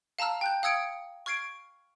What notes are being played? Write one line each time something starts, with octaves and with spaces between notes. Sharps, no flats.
F5 A5 A#5 E6 F6
G5 F#6 G6
F5 D#6 E6 G#6 C#7 D7
C#6 F6 G#6 C7 D7